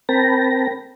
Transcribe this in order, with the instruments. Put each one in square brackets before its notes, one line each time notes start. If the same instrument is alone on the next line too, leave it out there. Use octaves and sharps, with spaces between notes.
[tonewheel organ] C4 A#4 G5 A5 B5 A#6